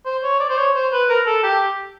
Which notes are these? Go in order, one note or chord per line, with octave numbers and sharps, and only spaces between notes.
C5
C#5
D5
C5
C#5
C5
B4
A#4
A4
G4